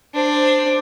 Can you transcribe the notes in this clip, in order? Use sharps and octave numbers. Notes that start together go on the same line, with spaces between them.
D4 C5